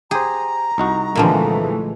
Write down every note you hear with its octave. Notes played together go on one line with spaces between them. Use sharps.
G4 G#4 C5 A#5
C2 D#4 F#4
A#2 D3 E3 F3 G#3 A3